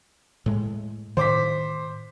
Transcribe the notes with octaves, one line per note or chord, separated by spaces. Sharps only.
A2 G#3
A2 D#3 C5 D6 B6